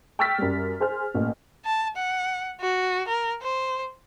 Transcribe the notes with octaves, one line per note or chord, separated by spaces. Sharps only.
G5 C#6 E6 F6 A6 B6
F#2 G3
G#4 C5 G#5 F6
A1 A#2
A5
F#5
F#4
A#4
C5